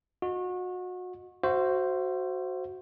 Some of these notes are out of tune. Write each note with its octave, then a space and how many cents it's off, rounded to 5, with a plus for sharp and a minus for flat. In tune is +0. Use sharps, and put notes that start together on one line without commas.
F#4 -30 D#5 +0
F#4 +0 C5 +0 E5 +35